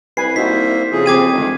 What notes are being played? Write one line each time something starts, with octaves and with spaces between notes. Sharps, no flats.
C2 B4 G#5 C7
A#3 D#4 F#4 C5 E5 B6
F2 C#3 G#4
C4 G4 D6 G#6 D#7
F1 D3 D#3 G#3